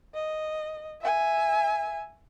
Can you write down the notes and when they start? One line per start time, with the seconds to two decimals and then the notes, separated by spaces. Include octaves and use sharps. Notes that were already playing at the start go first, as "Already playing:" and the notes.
0.14 D#5
1.01 E5 G#5